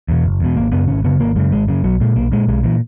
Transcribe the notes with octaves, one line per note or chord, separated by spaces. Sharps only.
E2 B2
F#1
E2 B2
G#1 A#3
F#2 C#3 B3
G#1 C#4
F#2 C#3 B3
G#1 A#3
F#2 C#3 G#3
G#1 G#3
F#2 C#3
B1 F#3
A#2 G#3
B1 A#3
A#2 G#3
B1 G#3
A#2 E3